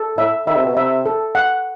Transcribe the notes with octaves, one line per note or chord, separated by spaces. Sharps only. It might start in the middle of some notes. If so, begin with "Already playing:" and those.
Already playing: A4
A2 E5
D#3 E5
C3
B2
C3 E5
A4
F#5